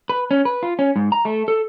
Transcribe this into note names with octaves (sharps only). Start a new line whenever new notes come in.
B4
C#4
B4
F4
C#4
G#2
A#5
A3
A4